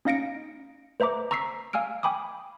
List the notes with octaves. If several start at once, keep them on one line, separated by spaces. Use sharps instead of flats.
C#4 D#4 F5 A#6 C#7 D7
B4 C5 E5 A#5 D6
A#5 C#6 E6 B6 C7
F5 G#5 E6 F6 D7
G5 G#5 B5 D6 D#6